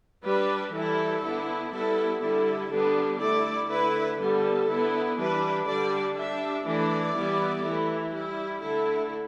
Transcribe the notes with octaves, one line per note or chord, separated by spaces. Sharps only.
G3 D4 B4
E3 G3 E4 A4
D3 B3 E4
G3 B3 E4 A4
D3 G3 E4 A4
D3 G3 B3 D4
D3 A3 E4 D5
D3 A3 E4 B4
D3 G3 B3 A4
D3 B3 E4
E3 G3 D4 B4
D3 G3 D4 D5
G3 D4 E5
E3 A3 D4 D5
E3 G3 B3 E4
E3 A3 E4
G3 E4
D3 A3 E4 A4